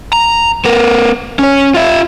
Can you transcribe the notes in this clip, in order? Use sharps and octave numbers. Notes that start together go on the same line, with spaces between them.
A#5
B3 A#4
C#4 C#5
F4 E5